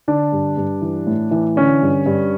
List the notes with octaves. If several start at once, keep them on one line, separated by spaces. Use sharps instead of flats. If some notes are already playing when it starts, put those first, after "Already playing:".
D3 D4
G2
G2
E3
A2
E3
D3 C#4
G2
G2